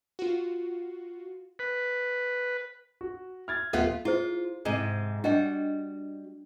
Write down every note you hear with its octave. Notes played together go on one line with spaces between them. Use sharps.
F4 F#4
B4
F#4
F6 G#6 A6
D#1 A3 B3 F4
E4 F4 G#4 C5
G#2 C3 G#3
G3 D4 F#4 D#5 G5